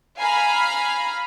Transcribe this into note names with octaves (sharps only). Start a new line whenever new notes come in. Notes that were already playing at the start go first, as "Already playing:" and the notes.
F5 G#5 A#5 B5 F6